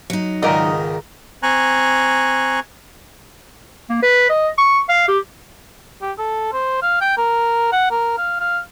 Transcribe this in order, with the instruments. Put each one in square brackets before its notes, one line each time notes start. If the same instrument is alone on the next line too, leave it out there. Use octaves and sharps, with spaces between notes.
[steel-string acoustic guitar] F#3 D#4
[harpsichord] C#2 G#2 D#3 [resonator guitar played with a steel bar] A#4 D#5
[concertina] C4 G#5 A#5 C#6 F#6
[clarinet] A#3
B4
D#5
C#6
F5
G4
[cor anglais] G4
A4
C5
F5
G5
A#4
F#5
A#4
F5
F5